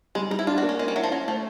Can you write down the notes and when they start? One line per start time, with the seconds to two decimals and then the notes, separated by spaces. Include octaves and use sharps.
0.15 G3 G#3
0.31 G3 D#4
0.39 E4
0.47 D4 F4
0.58 F#4
0.63 A#3
0.69 C#4
0.79 G#3 C#4
0.88 G3
0.95 F#3 E4
1.03 F3
1.11 F#3 C#4
1.28 F3 A3